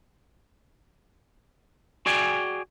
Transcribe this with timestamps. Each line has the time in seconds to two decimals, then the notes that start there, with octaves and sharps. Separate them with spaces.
2.06 F#4 G#4 D5 G5 G#5